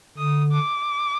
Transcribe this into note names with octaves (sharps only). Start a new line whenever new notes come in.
D3 D#6
D6